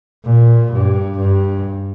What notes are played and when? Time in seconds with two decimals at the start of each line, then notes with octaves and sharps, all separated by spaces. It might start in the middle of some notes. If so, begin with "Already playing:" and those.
0.24 A#2
0.71 G2
1.18 G2